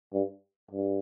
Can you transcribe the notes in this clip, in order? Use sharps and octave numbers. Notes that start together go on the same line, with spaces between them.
G2
G2